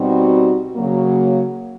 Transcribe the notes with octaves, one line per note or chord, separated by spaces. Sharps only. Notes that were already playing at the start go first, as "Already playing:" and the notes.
Already playing: B2 G3 C4 D#4 F#4
C#3 F#3 A#3